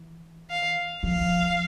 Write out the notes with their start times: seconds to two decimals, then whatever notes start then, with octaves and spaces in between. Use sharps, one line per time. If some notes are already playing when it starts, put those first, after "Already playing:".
Already playing: E3
0.50 F5
1.03 F3 F5